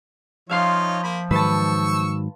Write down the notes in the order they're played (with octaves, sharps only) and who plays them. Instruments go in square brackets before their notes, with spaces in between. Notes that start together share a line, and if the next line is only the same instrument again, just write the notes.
[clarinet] F3 [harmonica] D#4 F4 C#5 [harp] E5 F5 C6
[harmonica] A#3 B5
[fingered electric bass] G#2 D#3 F#3 [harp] B4 A5 [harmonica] C#6 E6